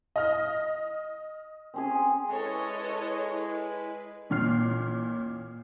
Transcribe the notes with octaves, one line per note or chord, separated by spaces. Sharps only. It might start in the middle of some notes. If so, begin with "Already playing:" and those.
D#5 F6
C4 C#4 G#4
G#3 E4 A4 B4 C#5 D#5
A1 A#2 F6 C7